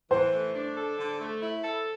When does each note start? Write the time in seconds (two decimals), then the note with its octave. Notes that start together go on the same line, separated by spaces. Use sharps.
0.11 E3 C5
0.33 A3
0.55 D4
0.77 A4
0.98 D3
1.21 A3
1.41 E4
1.64 A4